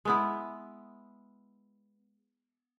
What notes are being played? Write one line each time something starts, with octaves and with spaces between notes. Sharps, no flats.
G#3 B3 E4